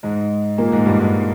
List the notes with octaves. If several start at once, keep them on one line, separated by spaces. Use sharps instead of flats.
G#2 G#3
A#2 A#3
G#2 G#3
G2 G3
G#2 G#3